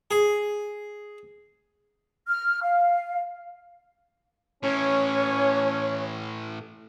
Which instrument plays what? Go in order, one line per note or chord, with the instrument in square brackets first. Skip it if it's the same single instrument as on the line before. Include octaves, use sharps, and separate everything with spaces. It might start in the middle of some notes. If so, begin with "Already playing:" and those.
[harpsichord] G#4
[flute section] F6
F5
[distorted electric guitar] A2 E3 [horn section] C#4 [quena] C#5